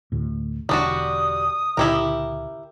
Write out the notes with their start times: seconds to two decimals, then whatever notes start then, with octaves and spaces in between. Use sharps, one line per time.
0.12 D2 A2
0.69 E1 D3 G3 D4 F#4 D#6
1.77 C#2 A#2 D3 E4 G4 A#4